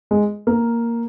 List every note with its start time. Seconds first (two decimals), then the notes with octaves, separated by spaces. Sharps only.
0.11 G#3
0.47 A#3